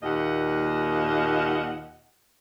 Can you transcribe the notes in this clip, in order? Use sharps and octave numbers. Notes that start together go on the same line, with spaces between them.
D#2 A#2 D#5 F5 F#5